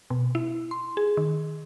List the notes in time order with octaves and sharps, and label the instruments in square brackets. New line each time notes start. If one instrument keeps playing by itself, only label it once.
[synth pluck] B2
E4
C6
G#4
D#3